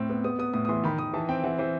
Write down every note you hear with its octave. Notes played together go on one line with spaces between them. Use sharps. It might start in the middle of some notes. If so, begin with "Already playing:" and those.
Already playing: A2 C4
B3
B3 D#6
B3 D#6
A2 D#6
D#6
E3 C6
D#3 B5
D#3 D#6
E3 A5
C4 G5
E3 F#5
E3 C5